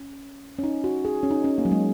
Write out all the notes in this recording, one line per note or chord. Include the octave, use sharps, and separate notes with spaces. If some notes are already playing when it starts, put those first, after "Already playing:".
Already playing: C#4
C#4
D#4
F#4
G#4
C#4
D#4
C#4
A#3
F#3
G#3